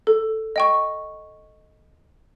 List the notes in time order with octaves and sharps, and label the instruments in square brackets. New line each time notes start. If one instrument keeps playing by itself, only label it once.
[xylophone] A4
D#5 G5 C#6